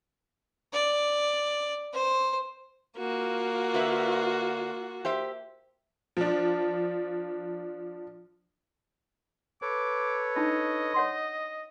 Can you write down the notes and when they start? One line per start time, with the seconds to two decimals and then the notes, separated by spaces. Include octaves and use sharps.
0.73 D5
1.93 C5
2.97 A#3 F4 F#4
3.74 D3 B4 E5
5.05 G4 C5 E5
6.17 F3 D4
9.62 A4 B4 C#5 D6
10.36 D4 D#4 F4 D#5
10.94 C#5 F#5 C6